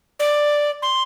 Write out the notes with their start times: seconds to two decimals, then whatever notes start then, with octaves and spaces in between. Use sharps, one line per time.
0.20 D5
0.82 C6